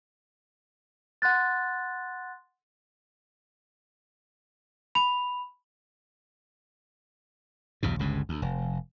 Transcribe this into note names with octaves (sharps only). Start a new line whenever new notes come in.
F#5 C6 F#6 A6
B5 F7
B1 E2 G2 B2
G1 C#2 G2 C#3
D2
F1